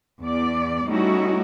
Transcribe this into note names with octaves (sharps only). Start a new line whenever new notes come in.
E2 D5
G3 A3 C#4 D#4 E4 F#4